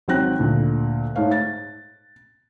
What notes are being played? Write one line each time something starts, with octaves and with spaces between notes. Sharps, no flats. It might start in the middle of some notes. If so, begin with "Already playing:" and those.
G#1 F#3 C4 G5 F#6 A#6
D2 A#2
G#2 A3 C#5 F5
A6